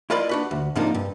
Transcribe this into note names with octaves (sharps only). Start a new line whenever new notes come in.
E4 F4 A#4 B4 D5 D#5
D4 F#4 B4
D2
G#2 C3 F3 A#3 D4 D#4
G2